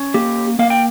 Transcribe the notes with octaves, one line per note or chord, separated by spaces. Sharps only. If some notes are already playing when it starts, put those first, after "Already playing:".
Already playing: C#4
A#3 G4
A#3 F5
G5